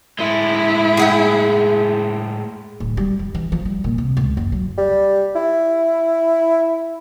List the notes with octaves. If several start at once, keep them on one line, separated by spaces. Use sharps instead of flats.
A2 G#3 E4
G#4 F#5 G5
D1
G3
F2
E3
F3
G3
A#2
C3
C#2
F#1
F#3
G3
E4